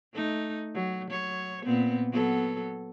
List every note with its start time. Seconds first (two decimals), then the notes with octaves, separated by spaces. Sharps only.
0.13 A3 D#4
0.75 F#3
1.10 F#3 C#5
1.65 A#2 B3 C4
2.12 F#3 B3 A4